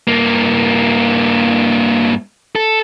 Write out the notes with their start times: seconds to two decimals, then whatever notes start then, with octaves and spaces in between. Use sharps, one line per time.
0.08 G2 A#3
2.56 A4